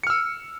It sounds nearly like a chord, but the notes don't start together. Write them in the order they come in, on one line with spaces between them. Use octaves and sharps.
C#7 F6 E6